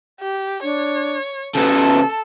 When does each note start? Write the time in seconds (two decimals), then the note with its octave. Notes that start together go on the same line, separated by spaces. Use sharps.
0.20 G4
0.63 D4 C#5
1.55 C#3 B3 A4 A5